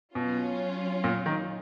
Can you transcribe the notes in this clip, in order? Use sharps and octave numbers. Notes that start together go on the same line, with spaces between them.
B2 F#3 C#4 F4
A#2
D#3